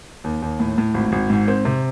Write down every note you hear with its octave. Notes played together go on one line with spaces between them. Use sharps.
D#2
D#2
A2
A2
G#1
G#1
G#2
C4
C3